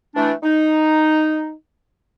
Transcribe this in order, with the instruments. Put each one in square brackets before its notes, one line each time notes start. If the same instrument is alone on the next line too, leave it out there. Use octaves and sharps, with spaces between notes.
[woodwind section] E3 A3 D4
D#4